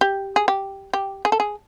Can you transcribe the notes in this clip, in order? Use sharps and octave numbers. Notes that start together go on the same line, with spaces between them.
G4
G#4
G4
G4
G#4
A4
G#4